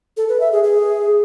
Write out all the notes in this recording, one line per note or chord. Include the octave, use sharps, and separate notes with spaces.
A4
B4
E5
G#4
G#4